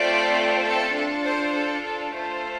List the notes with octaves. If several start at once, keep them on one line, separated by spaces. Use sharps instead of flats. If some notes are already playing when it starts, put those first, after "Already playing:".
Already playing: A3 C4 F4 A4 D5
A4
D4 F4 A4
C5
A4
A4
A3 F4 A4 C5